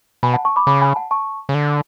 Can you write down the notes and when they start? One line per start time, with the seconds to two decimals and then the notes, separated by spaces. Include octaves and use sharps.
0.23 B2 G#5 B5
0.34 F#5 A5
0.45 A5 C#6
0.56 B5 D6
0.67 C#3 B5 D6
0.81 G#5 B5
0.96 F#5 A5
1.11 A5 C#6
1.49 C#3
1.54 D3